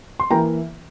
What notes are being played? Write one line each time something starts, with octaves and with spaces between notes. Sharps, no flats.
C6
E3 A#3 E4 G5 A#5